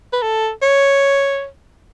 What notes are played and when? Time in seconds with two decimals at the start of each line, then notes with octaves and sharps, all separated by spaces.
0.13 B4
0.22 A4
0.62 C#5